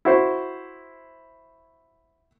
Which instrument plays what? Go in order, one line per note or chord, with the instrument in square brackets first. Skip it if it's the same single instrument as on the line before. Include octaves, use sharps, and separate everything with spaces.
[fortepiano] E4 F#4 C5